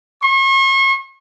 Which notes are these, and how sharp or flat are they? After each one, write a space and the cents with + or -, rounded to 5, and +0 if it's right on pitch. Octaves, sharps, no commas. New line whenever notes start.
C#6 -40